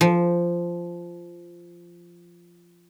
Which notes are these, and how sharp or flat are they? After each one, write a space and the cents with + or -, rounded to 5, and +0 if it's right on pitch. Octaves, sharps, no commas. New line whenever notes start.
F3 -10